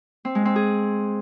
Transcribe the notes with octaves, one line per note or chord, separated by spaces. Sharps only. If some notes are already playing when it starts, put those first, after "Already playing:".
C4
G#3
C4
G#4